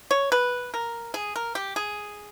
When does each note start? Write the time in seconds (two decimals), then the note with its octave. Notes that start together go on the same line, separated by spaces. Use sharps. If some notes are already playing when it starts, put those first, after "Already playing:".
0.11 C#5
0.32 B4
0.74 A#4
1.14 G#4
1.36 A#4
1.55 G4
1.76 G#4